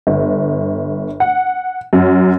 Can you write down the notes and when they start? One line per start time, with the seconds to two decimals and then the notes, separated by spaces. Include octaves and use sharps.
0.07 G1
1.20 F#5
1.93 F#2